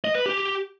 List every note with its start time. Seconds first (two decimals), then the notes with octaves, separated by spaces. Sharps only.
0.04 D#5
0.15 B4
0.26 G4